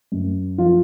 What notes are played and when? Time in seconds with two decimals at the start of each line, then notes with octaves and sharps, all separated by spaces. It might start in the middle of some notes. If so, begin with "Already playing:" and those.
0.12 F#2
0.58 F3 F4